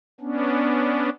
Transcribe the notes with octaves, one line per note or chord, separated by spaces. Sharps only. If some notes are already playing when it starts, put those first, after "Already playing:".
B3 C#4 D4